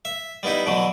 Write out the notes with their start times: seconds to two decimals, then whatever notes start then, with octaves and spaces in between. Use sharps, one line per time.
0.05 E5
0.43 G3 B3 D#4 E4
0.66 B2 D3 E3 F#3